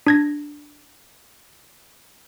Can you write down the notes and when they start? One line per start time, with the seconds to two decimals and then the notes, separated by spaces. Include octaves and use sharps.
0.07 D4 G#6 A#6